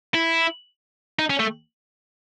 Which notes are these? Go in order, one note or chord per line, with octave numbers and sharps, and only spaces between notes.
E4
D#4
C#4
A3